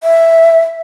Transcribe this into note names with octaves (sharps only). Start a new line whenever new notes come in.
E5